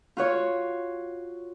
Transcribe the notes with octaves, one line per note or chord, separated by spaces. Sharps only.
F4 F#4 C#5